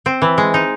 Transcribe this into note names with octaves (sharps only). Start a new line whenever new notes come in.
C4
E3
G#3
D#4